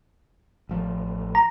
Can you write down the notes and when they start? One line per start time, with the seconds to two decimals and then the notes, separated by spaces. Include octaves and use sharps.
0.69 A1 F3 A3
1.35 A#5